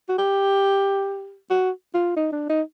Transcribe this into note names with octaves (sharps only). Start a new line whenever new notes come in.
F#4
G4
F#4
F4
D#4
D4
D#4